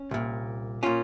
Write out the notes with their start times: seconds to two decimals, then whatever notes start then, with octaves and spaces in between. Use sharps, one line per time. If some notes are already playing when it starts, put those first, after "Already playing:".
Already playing: C#4
0.11 C2 A#2
0.83 A#2 C#4 F4